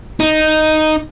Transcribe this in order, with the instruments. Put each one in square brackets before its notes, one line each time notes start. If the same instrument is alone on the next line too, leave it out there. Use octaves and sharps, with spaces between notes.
[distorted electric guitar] D#4